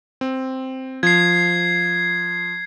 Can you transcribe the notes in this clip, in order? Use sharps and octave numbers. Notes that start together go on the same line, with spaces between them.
C4
F3 G#6 C7